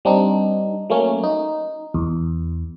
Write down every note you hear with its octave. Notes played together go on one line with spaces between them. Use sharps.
G3 C4 D4 D#4
F#3 A3 A#3 C#4
D#4
E2